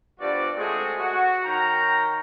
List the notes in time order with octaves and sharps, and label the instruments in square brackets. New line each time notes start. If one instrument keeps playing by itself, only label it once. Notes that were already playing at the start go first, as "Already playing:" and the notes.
[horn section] G2 F3 B3 F#4 D5
G#3 A3 C4 F#4 G#4
F#4
D#3 C#5 G5 A#5